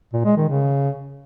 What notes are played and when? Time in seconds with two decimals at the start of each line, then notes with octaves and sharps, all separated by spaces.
0.13 A#2
0.25 G#3
0.37 D#3
0.48 C#3